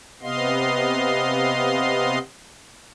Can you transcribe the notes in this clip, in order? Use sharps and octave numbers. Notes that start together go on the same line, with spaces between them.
C3 B3 D#5 F5 C6